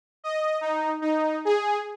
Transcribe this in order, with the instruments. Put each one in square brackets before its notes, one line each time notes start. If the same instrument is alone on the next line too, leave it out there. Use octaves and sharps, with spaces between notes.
[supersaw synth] D#5
D#4
D#4
G#4